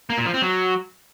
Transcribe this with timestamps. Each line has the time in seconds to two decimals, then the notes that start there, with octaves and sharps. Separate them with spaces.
0.10 A#3
0.18 A#2
0.26 F3
0.34 C4
0.42 F#3